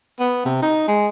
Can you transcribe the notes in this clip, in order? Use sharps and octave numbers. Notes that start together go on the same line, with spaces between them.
B3
C3
D#4
G#3